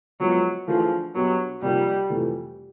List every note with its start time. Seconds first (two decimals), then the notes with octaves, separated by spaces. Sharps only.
0.20 F3 F#3 G#3 B3
0.68 E3 F3 A3 D4 F4 G#4
1.15 B2 F#3 G3 B3 D4
1.62 C3 F3 G3 A#3 D#4 G4
2.10 F2 C3 E3 A3